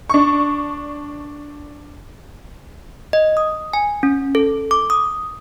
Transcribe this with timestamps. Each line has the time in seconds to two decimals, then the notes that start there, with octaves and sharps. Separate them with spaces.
0.10 D4 C#6
3.13 D#5
3.37 D#6
3.73 G#5
4.03 C#4
4.35 A4
4.71 D6
4.90 D#6